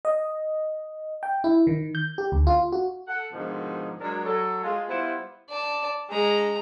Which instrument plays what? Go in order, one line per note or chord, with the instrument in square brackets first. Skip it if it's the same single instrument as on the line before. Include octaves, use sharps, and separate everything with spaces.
[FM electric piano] D#5
G5
E4
D#3
G6
G4
D2
F4
F#4
[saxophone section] A4 F#5
G#2 B2 D3 D#3 F3
F#3 G#3 D4 A#4
F#3 A4
G#3 F4
G3 B3 E4 F4 C5 F#5
[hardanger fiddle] D5 A5
G#3 A#5